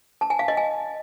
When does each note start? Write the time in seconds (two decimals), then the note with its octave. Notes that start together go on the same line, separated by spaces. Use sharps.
0.21 A5
0.30 G#5
0.39 F5
0.48 D#5
0.57 G#5